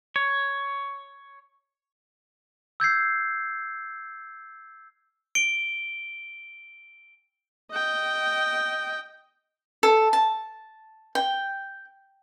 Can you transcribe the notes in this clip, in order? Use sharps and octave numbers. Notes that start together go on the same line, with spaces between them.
C#5
E6 G6 G#6 C7
D7 G7
D#5 G5
A4
A5
G5